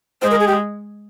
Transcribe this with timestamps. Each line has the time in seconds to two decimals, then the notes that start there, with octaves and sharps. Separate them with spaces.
0.22 G#3 C5
0.31 A#4
0.40 G#4
0.47 G4